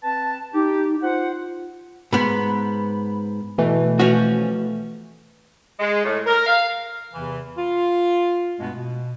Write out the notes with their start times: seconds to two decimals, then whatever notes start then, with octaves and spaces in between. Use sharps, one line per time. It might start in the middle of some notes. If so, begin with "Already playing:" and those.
0.04 C4 B4 A5
0.54 D#4 G4
1.03 F4 C5 F#5
2.13 G#2 B3 B5
3.58 B2 E3 A3
4.00 F3 C#4 F#4
5.80 G#3
6.04 A2
6.27 A#4
6.47 F5
7.13 E2 C3 E3
7.57 F4
8.59 G2 B2 G#3 A3 B3
8.74 B2